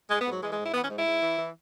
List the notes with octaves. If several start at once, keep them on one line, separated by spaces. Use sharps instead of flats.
G#2 G#3
B3
G#2
F#3
E3 G#3
G#3
G#2
E4
E3 B3
C#4
G#2
E4
G#2
E3
E3